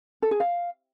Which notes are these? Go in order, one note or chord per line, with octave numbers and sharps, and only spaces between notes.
A4
G#4
F5